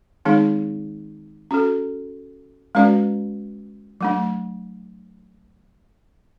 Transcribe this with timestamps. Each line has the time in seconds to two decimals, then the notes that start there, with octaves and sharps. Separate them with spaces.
0.25 D#3 G#3 C4 D#4 G#4
1.51 C#4 F#4 A4
2.75 G#3 C#4 F#4 B4 D5
4.01 F#3 A3 D4